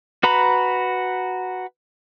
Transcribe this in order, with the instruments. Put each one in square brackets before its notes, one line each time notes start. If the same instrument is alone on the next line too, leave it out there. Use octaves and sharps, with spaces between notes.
[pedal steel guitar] F#4 B4 A#5 B5